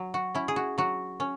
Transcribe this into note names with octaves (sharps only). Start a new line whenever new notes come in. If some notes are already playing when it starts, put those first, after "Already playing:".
Already playing: F#3
F#4
C#4 E4
G#4
F#4
F#3 F#4
C#4